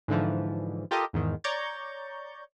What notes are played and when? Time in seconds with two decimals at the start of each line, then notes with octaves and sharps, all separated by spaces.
0.08 G#2 D3 E3 F3
0.91 F4 G4 A4 A#4 D#5
1.13 E2 G#2 D#3
1.44 C#5 D5 A#5 C#6 G6 A6